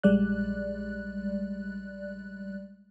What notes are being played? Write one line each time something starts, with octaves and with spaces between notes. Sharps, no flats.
A#1 G3 G#3 D5 F#6